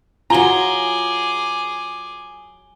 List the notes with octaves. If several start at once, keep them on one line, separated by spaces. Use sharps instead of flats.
F#3 F4 G#4 G#5 A#5 D6 G7